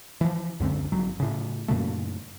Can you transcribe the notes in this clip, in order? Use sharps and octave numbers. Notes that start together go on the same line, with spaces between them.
E3 F3
C#2 F#2 D3 C4
G1 F#3
A2 C#3
F#2 A#2 C#3 A3